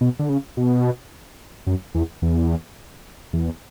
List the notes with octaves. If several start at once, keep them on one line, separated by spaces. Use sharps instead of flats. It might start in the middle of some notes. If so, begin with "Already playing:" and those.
B2
D3
C#3
B2
F#2
E2
E2
E2